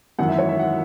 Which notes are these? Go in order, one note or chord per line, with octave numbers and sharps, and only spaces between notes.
G#1 F#2 E3 F#5
E5
C#5
E5
F#5